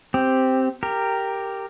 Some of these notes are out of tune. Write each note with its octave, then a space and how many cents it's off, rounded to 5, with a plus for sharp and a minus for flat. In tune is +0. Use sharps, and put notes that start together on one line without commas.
C4 +0 G4 +0
G4 +0 A#4 -10